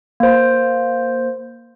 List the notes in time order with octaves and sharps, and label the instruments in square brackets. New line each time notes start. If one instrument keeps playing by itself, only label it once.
[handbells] A#3 C5